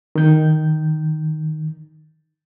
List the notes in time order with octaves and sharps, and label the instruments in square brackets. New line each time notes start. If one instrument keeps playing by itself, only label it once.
[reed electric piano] D#3 G6